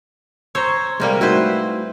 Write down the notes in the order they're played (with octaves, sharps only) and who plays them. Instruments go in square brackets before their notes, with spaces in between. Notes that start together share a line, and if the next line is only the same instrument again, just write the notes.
[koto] C5 C#5 [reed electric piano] A#5 C#6 E6
[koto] C3 G3 A#3 [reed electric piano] G#3 A#5
[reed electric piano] A3 D#4 F#4 [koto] E4 B4 C5